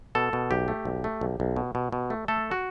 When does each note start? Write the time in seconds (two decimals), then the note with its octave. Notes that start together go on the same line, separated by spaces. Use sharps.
0.15 B2 A4
0.33 B2
0.51 B1 G4
0.68 A3
0.85 B1
1.04 A3
1.21 B1
1.40 B1
1.56 B2
1.75 B2
1.92 B2
2.10 A3
2.28 A3 A4
2.51 F#4